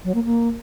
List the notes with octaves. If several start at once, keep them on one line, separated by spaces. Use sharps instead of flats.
F#3
A#3
A#3